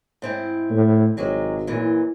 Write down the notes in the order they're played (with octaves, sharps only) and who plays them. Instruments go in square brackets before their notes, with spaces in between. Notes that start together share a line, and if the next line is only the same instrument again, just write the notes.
[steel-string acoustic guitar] G#2 C4 E4
[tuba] A2
[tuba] G#1 [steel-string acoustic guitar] C3 F#3 G#3
[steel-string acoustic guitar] F#2 A#2 E3